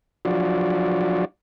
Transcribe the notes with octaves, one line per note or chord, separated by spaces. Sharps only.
F3 F#3 D4 F4 F#4 D5